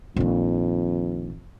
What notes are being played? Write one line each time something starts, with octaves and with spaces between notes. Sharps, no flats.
A#1 F2 D#3